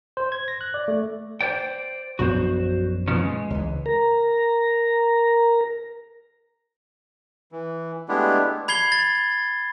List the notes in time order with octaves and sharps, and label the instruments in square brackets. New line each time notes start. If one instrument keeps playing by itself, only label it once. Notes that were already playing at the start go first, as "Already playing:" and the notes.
[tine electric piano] C5
G#6
A#6
F#6
D5
A3
[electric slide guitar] C5 D5 G5
[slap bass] A#1 F#2 B3 [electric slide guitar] F#4 C5
[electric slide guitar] B2 F3 C#4
G#3
[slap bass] C#2 E3
[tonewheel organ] A#4 A#5
[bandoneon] E3
G#3 A3 B3 D4 E4 G4
[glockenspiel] B5 G#6 C7 G7
A6